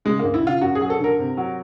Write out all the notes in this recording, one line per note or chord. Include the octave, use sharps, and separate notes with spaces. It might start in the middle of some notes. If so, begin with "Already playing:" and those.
C#3 G#3
D2 A#3
E4
C#3 F4
F#2 F#4
G#4
F#3
A4
D3 A#4
C3
F#3